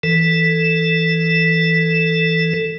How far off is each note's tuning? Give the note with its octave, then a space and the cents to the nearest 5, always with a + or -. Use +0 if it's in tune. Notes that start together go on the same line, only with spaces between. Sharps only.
E3 +0 A4 +10